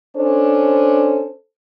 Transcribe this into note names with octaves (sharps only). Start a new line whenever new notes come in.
C#4 D4 A4 C5